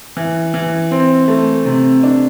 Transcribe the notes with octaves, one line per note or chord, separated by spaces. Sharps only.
E3
E3
C4
A3
C3
D4